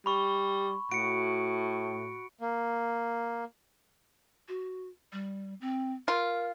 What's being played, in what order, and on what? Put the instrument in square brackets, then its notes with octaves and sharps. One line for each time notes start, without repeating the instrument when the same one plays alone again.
[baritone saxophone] G3 [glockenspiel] B5 C#6
[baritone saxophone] A2 [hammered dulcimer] F#4 [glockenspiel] C#7 D7
[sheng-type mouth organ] A#3
[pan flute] F#4
G3
C4
[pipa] F4 [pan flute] A#4